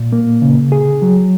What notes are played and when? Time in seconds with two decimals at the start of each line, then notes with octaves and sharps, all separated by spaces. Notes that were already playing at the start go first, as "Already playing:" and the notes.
Already playing: A#2
0.12 A#3
0.42 C#3
0.72 G#4
1.02 F#3